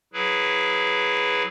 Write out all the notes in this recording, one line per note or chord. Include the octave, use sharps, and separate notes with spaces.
F#3 E4 G#4 B4